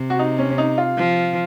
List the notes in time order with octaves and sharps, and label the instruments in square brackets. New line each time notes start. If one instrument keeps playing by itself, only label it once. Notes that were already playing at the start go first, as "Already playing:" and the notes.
Already playing: [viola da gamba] C3
[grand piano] F#4
D#4
C#4
C#4
D#4
F4
[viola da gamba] F3